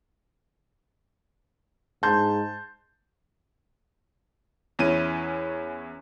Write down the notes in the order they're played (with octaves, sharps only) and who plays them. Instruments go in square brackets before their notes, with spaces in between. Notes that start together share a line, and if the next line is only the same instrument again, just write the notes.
[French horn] G#2 [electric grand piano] A5 [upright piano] C6 G6
[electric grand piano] E2 C#4 E4 D#7